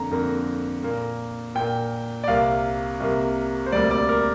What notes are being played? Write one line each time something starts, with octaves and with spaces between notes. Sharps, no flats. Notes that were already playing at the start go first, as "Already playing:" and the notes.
Already playing: F2 D3 A#3 A#5
F2 D3 A#3
A#2 A#3
A#2 A#3 G5
D5
C2 C3 A#3 F5
C2 C3 A#3
C5
D2 C3 G3 A#3 D5
D5
A#4